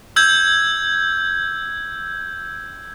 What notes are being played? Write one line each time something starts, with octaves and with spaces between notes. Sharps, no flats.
E6 G6 G#6